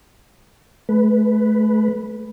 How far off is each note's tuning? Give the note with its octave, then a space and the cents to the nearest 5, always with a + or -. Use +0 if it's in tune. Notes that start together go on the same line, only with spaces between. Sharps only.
A3 -35 B4 +0